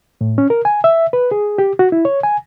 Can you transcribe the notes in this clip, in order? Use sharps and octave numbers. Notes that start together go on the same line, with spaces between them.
A2
C#4
A#4
G#5
E5
B4
G#4
G4
F#4
E4
C#5
G#5